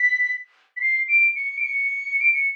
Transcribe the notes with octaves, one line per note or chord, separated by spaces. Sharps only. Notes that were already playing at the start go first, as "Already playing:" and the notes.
Already playing: B6
B6
C7
D7
C#7
D7
C#7
D7
C#7